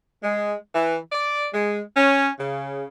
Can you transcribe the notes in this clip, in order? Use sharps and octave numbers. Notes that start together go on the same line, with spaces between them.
G#3
E3
D5
G#3
C#4
C#3